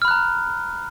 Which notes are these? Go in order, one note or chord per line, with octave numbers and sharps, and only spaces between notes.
A#5 B5 F6 F#6